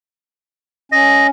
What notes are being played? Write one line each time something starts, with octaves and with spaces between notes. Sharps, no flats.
C#4 D#5